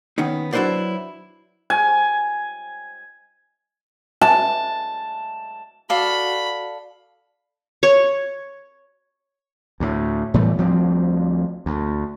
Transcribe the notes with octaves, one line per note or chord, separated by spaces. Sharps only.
D#3 B3 C#4 D#4
F#3 D4 E4 B4 C5 D5
G#5
A5
F#4 A4 D5 F5 B5
C#5
D2 A2
A2 E3 G3 A3
D2 F3 G3 C4
D2